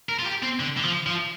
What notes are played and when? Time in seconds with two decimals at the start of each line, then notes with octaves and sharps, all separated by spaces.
0.09 A#4
0.19 F4
0.26 G4
0.43 C4
0.60 D3
0.77 D3
0.83 F3
1.06 F3